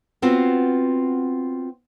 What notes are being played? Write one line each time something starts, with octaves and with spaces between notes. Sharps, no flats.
B3 C4 F4 F#4